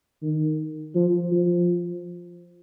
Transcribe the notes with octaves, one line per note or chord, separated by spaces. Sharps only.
D#3
F3
F3